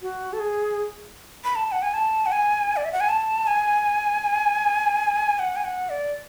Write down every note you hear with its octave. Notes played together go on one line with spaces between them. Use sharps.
F#4
A4
G#4
B5
A5
F#5
G#5
A5
F#5
G#5
D5
E5
F#5
G#5
A5
G#5
F#5
G#5
F#5
D5